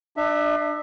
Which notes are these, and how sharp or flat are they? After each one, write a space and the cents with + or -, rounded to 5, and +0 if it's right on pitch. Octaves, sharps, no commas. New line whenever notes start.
D4 +35 E5 -10